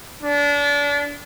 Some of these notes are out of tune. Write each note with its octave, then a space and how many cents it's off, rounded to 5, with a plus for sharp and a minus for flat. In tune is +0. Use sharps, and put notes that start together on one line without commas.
D4 -30